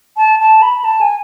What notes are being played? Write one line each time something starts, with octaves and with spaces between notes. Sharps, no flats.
A5
A5
B5
A5
G#5